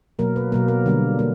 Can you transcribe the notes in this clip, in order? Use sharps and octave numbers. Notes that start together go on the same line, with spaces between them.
B2 F#3 A#3 A#4
B4
B2 F#3 A#3 A#4
A#4
D3 G3 A#3
A#3